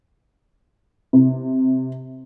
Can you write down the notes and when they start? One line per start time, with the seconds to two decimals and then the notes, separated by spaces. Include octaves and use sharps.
1.13 C3